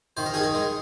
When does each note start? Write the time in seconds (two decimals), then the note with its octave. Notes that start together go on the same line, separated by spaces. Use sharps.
0.17 D#3 C5
0.26 A#4
0.34 D#4 G#4
0.43 A#4
0.54 G#3